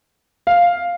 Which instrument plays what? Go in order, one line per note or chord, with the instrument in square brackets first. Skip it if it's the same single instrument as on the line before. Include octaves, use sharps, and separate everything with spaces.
[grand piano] F5